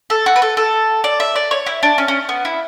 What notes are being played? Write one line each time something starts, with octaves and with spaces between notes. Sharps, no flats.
A4
F#4
B4
A4
A4
D5
E5
D5
C#5
E4
D4
C#4
C#4
B3
E4